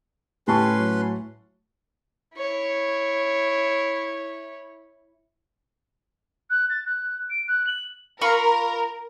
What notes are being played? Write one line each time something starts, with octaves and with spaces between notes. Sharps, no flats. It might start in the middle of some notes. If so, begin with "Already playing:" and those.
A2 C#4 G4 B4 A5 C6 C#6
F#3
E4 C#5
F#6
A6
F#6
D7
F#6
F#7
F4 A#4 B5 C#6